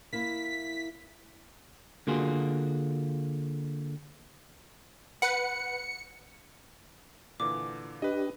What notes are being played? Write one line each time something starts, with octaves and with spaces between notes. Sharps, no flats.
A#3 E4 B6
D3 A#3 F4 F#4 G#4
B4 F#5 C#7
A#2 D3 E3 D6
D4 G4 B4 D#5